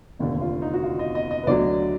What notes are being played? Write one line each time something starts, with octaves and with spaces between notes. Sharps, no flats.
F1 D#2 D3
F4
D#4
F#4
F4
D#5
D#5
D#5
B4
D2 D3 F#3 D5